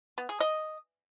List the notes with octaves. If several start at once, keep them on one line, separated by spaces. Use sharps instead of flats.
B3
G#4
D#5